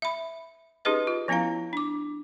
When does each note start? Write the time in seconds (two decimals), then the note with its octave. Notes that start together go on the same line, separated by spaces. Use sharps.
0.02 E5 B5
0.85 C#4 D#4 G4 G#4 B4 D#5
1.07 F4
1.28 F3 B3 C#4 E4 F5 A#5
1.73 D4 D6